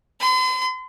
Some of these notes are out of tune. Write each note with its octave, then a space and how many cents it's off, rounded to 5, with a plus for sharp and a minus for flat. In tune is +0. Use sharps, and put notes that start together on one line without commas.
C6 -45